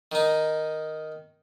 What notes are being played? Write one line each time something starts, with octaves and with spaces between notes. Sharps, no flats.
D#3 D#4